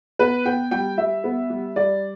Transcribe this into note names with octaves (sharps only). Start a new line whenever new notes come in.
B3 B4
B3 G5
G3 G5
G3 E5
B3
G3
G3 D5